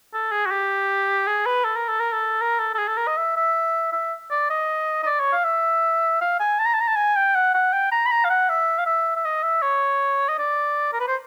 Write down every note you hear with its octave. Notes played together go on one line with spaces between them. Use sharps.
A4
G#4
F#4
G4
G#4
B4
A4
A#4
A4
A#4
A4
A#4
A4
A4
G#4
A4
A#4
D#5
E5
E5
E5
D5
D#5
D#5
D5
C#5
F5
E5
F5
G#5
A5
A#5
A5
A#5
A5
G#5
G5
F#5
F#5
G5
A#5
B5
A#5
F5
F#5
E5
F5
E5
E5
D#5
E5
C#5
D#5
D5
A#4
B4
C5